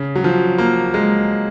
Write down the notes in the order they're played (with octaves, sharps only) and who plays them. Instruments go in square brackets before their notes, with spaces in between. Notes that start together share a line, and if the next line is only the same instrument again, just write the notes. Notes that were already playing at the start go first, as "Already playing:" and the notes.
Already playing: [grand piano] C#3
F#3
F3
A#3
G#3